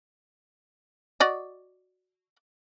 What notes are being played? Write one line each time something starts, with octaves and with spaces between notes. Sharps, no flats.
F#4 D5 D#5